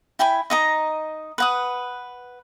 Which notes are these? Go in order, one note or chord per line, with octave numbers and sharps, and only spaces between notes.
E4 G5 G#5 B5
D#4 D#5 A#5
B4 F#5 D#6